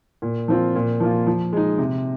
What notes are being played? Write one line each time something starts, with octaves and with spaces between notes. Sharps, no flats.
A#2
F3 C4 F4
A#2
F3 A#3 F4
F3
G#3 D#4
C3